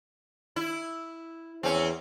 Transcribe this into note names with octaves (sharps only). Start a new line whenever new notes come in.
E4
E2 C4 C#4